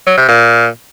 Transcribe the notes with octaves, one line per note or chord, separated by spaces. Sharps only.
F#3
C3
A#2